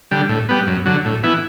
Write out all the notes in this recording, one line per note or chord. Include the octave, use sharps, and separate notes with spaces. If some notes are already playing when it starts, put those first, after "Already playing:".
D3 G3
A2
G3 B3
F#2
D3 F#3
A2
E3 B3 E4